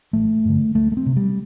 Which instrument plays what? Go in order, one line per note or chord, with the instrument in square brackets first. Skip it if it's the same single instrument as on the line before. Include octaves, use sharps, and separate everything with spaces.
[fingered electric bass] A1 A3
G2 D3
D2 A3
A3
C4
C3
G3